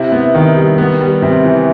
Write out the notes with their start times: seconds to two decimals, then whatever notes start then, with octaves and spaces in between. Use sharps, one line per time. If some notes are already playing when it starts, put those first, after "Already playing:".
Already playing: C3 E4
0.12 B3
0.35 D#3
0.57 G3
0.78 B3
1.01 G3
1.22 C3
1.45 E3